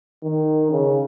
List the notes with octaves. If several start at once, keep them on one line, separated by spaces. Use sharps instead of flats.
D#3
C#3